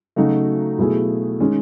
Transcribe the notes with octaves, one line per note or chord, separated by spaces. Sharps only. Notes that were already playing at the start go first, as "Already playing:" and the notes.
C#3 F#3 A3 D#4 F#4
B2 F#3 A3 E4 G#4
D#3 G#3 C#4